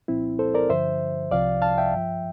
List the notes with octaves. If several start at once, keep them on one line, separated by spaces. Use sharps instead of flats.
C2 A#2 F3 C4 E4
A4 C5
A#4 D5
G2 D3 F3 C5 E5
C2 C3 F3 D5 F5
F5 A5
E5 G5
G2 F3